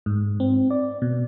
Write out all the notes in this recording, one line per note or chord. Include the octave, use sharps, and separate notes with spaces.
G#2
C4
D5
B2